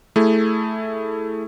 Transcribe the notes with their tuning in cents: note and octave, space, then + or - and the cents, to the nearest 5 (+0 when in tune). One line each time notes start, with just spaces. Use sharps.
A3 +0 E4 +0 G#4 +0